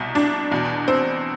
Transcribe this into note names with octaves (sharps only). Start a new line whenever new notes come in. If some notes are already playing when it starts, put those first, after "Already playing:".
Already playing: C2 B2
D4
E2 B2
C4